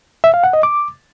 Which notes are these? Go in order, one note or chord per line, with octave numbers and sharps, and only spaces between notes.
E5
F5
F#5
D#5
D6